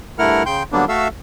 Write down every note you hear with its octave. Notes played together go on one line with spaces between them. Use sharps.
G2 A3 E4 A#4 F#5 F6
C#3 G5 C6 G6
D3 F#3 G3 A#3 B3 D4
A3 F#4 A4 E5 F5 E6